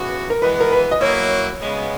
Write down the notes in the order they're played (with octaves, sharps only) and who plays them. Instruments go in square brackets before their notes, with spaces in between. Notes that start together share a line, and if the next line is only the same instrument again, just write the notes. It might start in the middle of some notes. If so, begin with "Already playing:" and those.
Already playing: [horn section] C#3 E3 B3 F#4
[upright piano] A#4
[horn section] E3 G#3 B3 [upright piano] B4
[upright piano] A#4
B4
D#5
[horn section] F#3 A#3 E4 [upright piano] C#5
[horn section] C#3 G#3 B3